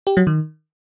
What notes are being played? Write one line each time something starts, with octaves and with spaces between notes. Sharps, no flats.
G4
F#3
D#3